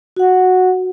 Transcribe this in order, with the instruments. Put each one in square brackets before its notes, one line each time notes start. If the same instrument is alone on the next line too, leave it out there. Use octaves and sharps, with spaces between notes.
[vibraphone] F#4 F#5